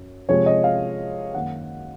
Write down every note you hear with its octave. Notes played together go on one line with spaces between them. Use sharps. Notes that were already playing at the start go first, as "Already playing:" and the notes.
Already playing: F#2
C3 F3 G#3 C#5
D#5
F5
F#2 D#3 F#3 A#3 F#5